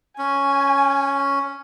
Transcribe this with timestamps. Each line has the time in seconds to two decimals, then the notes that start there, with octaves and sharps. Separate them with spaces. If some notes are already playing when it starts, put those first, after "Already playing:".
0.19 C#4 G#5